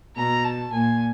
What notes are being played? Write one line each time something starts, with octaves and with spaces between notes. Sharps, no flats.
B2 A#5
A5
A#2 G#5